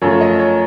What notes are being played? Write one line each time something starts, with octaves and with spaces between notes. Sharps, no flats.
F#2 F3 A3 C#5
C#5
D#5
C#5